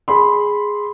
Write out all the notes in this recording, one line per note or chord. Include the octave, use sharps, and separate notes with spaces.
G#4 B5 C6